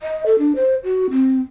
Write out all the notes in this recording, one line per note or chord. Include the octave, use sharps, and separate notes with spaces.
D#5
A4
D4
C5
F#4
C4